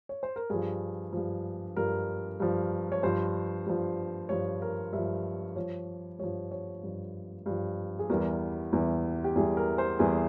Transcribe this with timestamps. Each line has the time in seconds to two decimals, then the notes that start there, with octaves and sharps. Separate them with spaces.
0.09 C#5
0.23 C5
0.36 A#4
0.50 G2 F3 G#4
1.13 G2 F3
1.76 G2 F3 A#4
2.40 G2 F3
2.92 C#5
3.03 G2 F3 C5
3.66 G2 F3
4.29 G2 F3 C#5
4.62 A#4
4.92 G2 F3 E5
5.56 G2 F3 C#5
6.19 G2 F3 C#5
6.51 C#5
6.83 G2 F3
7.46 G2 F3
7.99 G#4
8.09 E2 E3 G3 A#4
8.72 E2 E3 G3
9.24 G4
9.36 E2 E3 G3 G#4
9.57 A#4
9.78 C5
9.99 E2 E3 G3 G#4